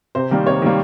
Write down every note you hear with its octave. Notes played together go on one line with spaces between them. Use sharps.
C3 C5
D#3 G3 A#3
C3 C#5
D#3 G3 A#3